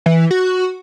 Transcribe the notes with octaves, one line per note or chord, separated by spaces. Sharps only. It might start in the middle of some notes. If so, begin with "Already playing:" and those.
E3
F#4